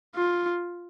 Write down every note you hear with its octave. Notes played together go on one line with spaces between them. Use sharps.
F4